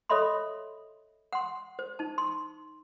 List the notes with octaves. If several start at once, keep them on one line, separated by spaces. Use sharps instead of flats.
A4 C#5 D#5 E5 B5 C6
F#5 C6
C5
D#4 A5
C6